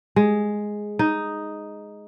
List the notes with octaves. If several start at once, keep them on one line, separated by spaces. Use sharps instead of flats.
G#3
D#4